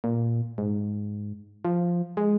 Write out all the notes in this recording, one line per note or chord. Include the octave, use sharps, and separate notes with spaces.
A#2
G#2
F3
G#3